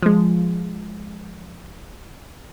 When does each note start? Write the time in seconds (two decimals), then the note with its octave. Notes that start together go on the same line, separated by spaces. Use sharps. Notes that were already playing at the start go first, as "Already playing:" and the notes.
0.03 F3 G#3